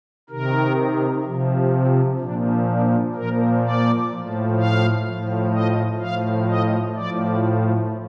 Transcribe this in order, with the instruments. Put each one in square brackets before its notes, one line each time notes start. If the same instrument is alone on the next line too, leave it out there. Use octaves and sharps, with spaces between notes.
[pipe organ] C3 D#3 A#4
C3 F3
C4
A#2 F3 D4
D4
A#2 F3 A#4
D5
A2 F3
F5
A2 F3
D#5
A2 F3 F5
D#5
A2 F3 D5